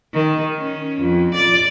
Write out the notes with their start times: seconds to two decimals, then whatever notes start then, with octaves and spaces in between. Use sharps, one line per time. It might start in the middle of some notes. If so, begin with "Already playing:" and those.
0.13 D#3
0.58 C#4
1.01 F2
1.35 D5